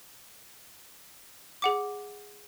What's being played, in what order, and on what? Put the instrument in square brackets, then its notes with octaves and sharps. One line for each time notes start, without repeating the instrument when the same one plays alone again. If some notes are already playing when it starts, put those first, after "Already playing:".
[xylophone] G#4 F#5 D6